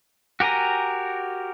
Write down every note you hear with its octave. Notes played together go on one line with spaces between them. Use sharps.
F#4 G4 A#4 G#5 A#5